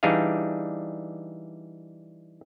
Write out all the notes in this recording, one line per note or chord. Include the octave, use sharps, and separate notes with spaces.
E3 G3 D4 D#4 G#4 F5